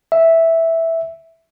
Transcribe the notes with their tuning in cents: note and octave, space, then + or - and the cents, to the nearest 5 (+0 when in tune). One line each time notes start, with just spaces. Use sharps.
E5 -5